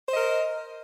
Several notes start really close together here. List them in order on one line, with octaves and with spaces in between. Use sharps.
C5 D#5 A#4